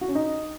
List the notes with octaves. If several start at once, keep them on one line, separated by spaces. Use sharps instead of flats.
F#4
C#4
D#4